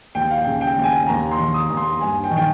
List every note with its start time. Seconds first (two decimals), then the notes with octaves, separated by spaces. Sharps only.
0.15 D#2 G5
0.30 F5
0.38 G5
0.45 C#3
0.61 G5
0.76 D#2 G5
0.84 G#5
1.07 D#2 A#5
1.31 C6
1.38 D#3
1.54 D#6
1.69 D#2
1.77 C6
2.00 G2 G#5
2.24 G5
2.31 D#3
2.37 G5